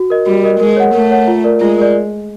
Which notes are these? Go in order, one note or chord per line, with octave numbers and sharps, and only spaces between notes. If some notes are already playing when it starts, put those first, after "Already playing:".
Already playing: F#4
A#4 D#5
G3 F#4
A#4 D#5
G#3 A#4
C#5 F#5
A3 A#4
C#5 F#5
F4
A#4 D5
G#3 F4
A#4 D5